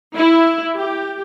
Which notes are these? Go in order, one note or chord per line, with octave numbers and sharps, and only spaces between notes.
E4
G4